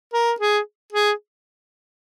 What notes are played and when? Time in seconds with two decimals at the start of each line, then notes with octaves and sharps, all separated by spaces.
0.14 A#4
0.40 G#4
0.93 G#4